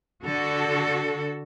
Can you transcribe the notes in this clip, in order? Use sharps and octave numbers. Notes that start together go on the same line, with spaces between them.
D3 F#4 A4